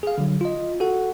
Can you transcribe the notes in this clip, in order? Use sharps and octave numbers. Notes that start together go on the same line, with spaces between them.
G#4 F5
D3 F#3
F4 D#5
F#4 A4 F#5